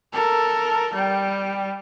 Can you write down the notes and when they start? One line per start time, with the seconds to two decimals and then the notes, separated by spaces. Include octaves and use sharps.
0.13 A4 A#4
0.93 G3 G5